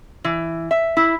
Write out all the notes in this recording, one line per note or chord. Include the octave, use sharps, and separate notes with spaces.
E3
E5
E4